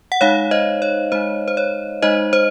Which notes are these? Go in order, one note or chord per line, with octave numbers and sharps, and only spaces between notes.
F#5
G#3 D#4 C#5 F5
C5 D#5
C#5
G#3 D#4 C5
C5
C#5
G#3 D#4 C5 D#5
C5